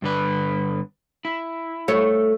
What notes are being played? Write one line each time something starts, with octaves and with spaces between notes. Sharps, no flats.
G2 D3 B4
E4
A3 C#5